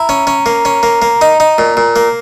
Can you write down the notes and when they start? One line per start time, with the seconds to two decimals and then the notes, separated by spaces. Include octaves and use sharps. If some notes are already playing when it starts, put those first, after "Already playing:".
Already playing: E4 A#5
0.09 C#4
0.27 C#4
0.46 A#3
0.65 C#4
0.83 A#3
1.02 A#3
1.21 D#4
1.40 D#4
1.58 A#2
1.77 A#2
1.96 A#3